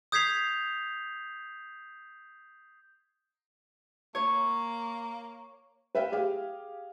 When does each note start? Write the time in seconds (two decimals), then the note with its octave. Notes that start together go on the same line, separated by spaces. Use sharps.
0.12 D#6 G6 G#6 B6 C7 F7
4.15 A#3 C#5
5.95 B4 E5 F5 G5
6.12 G4 G#4 F5 G5